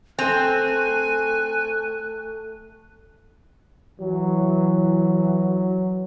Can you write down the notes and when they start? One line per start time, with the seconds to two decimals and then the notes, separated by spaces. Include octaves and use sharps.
0.19 A3 C4 G#5 F#6
4.00 E3 F#3